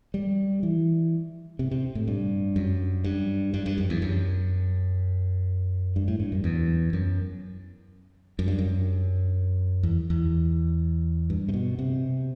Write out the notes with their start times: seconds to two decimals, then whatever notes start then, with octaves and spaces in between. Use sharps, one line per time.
0.14 G3
0.63 E3
1.59 C3
1.71 C3
1.95 A2
2.08 G2
2.56 F#2
3.04 G2
3.54 G2
3.66 G2
3.78 F#2
3.90 E2
4.02 F#2
5.96 G2
6.08 A2
6.20 G2
6.32 F#2
6.44 E2
6.93 F#2
8.39 F#2
8.48 G2
8.59 F#2
9.83 E2
10.10 E2
11.30 G2
11.49 C3
11.54 B2
11.79 C3